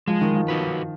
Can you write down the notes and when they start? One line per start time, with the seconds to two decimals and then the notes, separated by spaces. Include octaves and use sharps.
0.07 F3 G#3
0.21 D#3
0.36 F3
0.48 D#4 F#4 B4